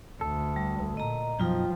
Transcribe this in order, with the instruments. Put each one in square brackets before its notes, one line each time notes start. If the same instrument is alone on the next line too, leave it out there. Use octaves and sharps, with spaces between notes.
[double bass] D2 [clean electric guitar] A4
[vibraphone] G3
[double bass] A#2 [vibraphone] D#5 A#5
[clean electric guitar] B1 F#2 D#4 [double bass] F3 [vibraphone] F4 G5